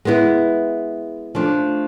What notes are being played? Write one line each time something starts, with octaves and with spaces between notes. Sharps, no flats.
G#3 B3 E4
F3 A3 D4